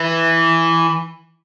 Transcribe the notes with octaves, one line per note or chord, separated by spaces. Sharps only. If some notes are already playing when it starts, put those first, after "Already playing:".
Already playing: E3